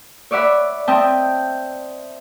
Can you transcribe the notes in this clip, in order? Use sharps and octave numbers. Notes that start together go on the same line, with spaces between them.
C#5 D5 E5 F#5 B5
C4 D#5 E5 G5 A5